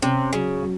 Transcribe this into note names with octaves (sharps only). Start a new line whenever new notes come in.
C3 C#4
C#3 F#3
F#3